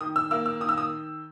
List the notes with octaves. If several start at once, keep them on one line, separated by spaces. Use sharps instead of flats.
D#3 D#6
E6
A#3 E6
E6
D#3 D#6
E6
D#6